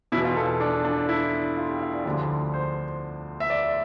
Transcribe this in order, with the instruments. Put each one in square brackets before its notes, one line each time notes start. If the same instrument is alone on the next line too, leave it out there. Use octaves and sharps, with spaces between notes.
[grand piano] B2 E4
E2
F4
A4
D4
D4
E4
F4
G4
F5
D5
D2 D3 F3
C5
E5
D5